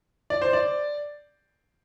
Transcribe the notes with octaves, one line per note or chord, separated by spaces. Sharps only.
D5
C5
D5